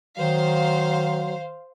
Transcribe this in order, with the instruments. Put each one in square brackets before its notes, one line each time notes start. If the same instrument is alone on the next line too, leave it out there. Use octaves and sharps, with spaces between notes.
[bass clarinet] D#3 [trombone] F#3 [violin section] C5 F5